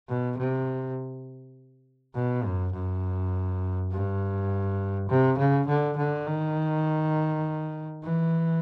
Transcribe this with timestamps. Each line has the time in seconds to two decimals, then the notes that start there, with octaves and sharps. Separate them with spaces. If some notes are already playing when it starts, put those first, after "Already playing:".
0.09 B2
0.38 C3
2.15 B2
2.44 F#2
2.73 F#2
3.92 G2
5.09 C3
5.38 C#3
5.68 D3
5.98 D3
6.27 D#3
8.03 E3